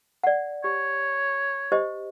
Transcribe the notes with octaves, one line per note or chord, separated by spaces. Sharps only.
D5 F#5
G4 C#5
G4 C5 D#5